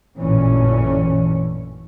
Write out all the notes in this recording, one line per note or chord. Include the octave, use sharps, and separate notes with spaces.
A1 F#2 A#2 D3 E3 C#4